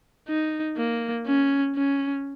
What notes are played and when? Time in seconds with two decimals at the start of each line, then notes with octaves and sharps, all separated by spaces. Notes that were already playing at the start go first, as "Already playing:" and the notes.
0.28 D#4
0.77 A#3
1.26 C#4
1.75 C#4